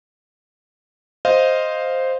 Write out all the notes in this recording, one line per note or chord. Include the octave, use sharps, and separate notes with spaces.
C5 D#5 F5